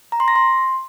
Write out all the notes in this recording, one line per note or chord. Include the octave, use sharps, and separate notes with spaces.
A#5
C6
A#6
C6